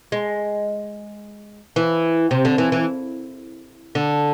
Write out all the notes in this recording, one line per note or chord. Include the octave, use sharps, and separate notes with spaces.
G#3
E3
C3
D3
E3
E3
D3